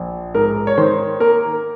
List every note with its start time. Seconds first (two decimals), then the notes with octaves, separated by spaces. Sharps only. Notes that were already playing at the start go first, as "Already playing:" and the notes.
Already playing: A#1
0.34 G#2 A#4
0.67 C#5
0.78 D#3 C5
1.20 A#3 A#4